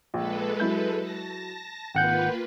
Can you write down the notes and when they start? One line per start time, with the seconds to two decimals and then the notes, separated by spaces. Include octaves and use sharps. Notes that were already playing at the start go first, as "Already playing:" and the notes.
0.14 A#1 G#3 A4 B4
0.60 F#3 E4 G6
0.98 A5 A#6
1.95 G#1 A#3 F4 B4 F#5 G5 G6